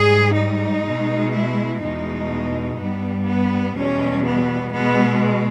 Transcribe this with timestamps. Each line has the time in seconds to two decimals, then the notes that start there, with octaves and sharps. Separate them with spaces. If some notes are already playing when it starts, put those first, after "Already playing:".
Already playing: G#2 G3 G#4
0.34 D#4
0.82 B2 G#3
1.32 E4
1.80 E2 B2 G#3 D#4
2.78 G2 G3 B3
3.26 B3
3.75 E2 B2 G3 C#4
4.24 B3
4.73 B2 G#3 B3